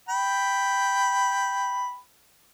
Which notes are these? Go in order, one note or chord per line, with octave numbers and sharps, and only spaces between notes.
G5 B5